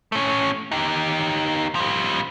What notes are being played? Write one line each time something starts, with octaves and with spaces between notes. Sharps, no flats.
A3 C#4
D#4 G4
F3 G3